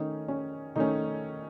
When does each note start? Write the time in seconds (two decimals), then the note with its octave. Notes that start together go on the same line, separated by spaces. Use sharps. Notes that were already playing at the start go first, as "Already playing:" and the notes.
Already playing: D#3 A3 C#4 D#4
0.28 C#4
0.76 D#3 A3 C#4 D#4